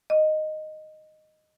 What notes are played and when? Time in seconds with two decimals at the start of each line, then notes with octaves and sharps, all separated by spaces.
0.10 D#5